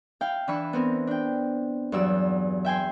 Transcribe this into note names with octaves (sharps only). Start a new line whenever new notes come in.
E4 F5 G5 F6
E3 D4 B5 C#6 E6
B3 C4 A#4
D4 G5
E2 G2 F#3 D5 E6
E5 G5 G#5 C6